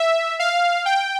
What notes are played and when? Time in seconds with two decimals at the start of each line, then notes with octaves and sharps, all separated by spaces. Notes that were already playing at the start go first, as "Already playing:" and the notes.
Already playing: E5
0.39 F5
0.85 G5